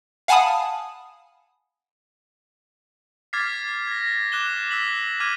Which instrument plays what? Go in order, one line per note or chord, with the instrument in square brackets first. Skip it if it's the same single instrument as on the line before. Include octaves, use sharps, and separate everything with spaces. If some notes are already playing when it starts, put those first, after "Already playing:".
[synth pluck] F5 F#5 G#5 A5 B5 D#6
[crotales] D6 F6 G#6 A6 B6 C7
G#6 A#6
D6 F#6 E7 G7
E6 B6 F#7
D6 F6 G#6 D#7